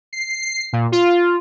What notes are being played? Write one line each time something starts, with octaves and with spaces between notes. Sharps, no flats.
C7
A#2
F4